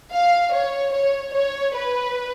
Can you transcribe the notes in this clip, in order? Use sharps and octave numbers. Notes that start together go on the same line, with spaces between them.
F5
C#5
C#5
C#5
B4